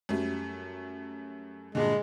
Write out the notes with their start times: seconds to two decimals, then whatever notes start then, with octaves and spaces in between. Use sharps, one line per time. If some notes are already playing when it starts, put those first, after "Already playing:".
0.09 F#2 G3 A3
1.75 G2 A#2 D3 G#3